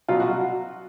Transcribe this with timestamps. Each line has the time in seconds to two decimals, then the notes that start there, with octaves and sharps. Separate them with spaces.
0.09 B2 F#3 F4
0.20 F#4